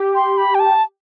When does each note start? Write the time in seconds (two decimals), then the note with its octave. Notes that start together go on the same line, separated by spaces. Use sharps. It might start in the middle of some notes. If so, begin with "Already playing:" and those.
Already playing: G4
0.15 C6
0.37 B5
0.55 G5
0.59 A5